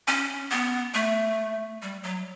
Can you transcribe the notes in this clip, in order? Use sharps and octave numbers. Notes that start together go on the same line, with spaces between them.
C#4
B3
A3
G3
F#3